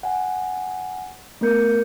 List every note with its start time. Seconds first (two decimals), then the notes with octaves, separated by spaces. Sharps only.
0.03 F#5 G#5
1.41 A3 B3 A#4 G6 C#7